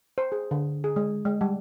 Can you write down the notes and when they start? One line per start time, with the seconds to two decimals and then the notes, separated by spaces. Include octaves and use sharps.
0.18 C5
0.32 G#4
0.51 D3
0.84 G#4
0.96 G#3
1.25 G#3
1.41 G3